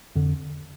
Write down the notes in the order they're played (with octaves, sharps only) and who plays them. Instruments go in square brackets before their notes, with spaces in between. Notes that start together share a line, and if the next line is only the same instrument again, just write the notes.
[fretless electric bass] F2 D3